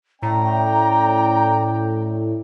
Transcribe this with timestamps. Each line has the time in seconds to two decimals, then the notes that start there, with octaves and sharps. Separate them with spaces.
0.22 A2 C#4 D5 G5 A#5